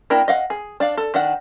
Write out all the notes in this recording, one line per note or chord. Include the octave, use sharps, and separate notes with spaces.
A#3 D4 E4 A#4 G5
D#5 F5 F#5
G#4
D4 D5 F5
A4
D#3 D4 F#5